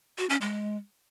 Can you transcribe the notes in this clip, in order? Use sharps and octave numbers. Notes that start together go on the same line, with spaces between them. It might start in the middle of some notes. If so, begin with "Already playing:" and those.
F#4
C#4
G#3